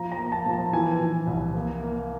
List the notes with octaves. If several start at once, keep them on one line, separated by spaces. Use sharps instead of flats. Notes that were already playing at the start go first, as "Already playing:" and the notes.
Already playing: F3 A#5
A#5
A#3
A5
F3
A5
E3 G#5
E3
C2
A#3
A#3